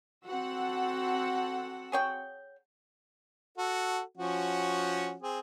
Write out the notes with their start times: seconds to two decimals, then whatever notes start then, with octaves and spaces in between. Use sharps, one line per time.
0.24 C4 F#4 A4 F#5 E6
1.92 G#4 C#5 G5
3.58 F#4 A4
4.17 F3 C#4 F#4
5.22 C4 G#4